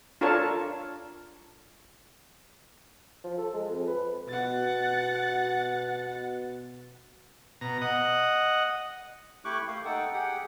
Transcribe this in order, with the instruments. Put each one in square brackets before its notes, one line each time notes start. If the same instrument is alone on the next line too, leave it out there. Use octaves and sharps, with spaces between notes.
[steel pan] D4 F4 A4 A#4 C#5 A5
[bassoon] F3
A4
G#3
F2
B4
[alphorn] B2 [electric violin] F#5 A6
[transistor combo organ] B2 A#5
D#5 F#5
[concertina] A3 E4 G4 C#6 D6 F#6
A3 A#3 F5
D#4 A4 F#5 G5
G4 G#4 F#5 G5